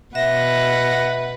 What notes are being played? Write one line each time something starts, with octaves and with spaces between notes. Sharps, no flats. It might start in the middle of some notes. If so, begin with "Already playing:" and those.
B2 B4 E5 F#5 A#6